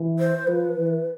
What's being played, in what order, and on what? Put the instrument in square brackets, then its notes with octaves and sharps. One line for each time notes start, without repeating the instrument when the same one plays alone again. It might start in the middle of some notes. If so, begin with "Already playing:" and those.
Already playing: [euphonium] E3
[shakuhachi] C5
[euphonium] F3 [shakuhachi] B4
[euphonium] E3